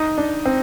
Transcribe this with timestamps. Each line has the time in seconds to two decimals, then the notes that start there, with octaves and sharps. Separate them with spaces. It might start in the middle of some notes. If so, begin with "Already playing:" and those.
Already playing: D#4
0.18 D4
0.45 C4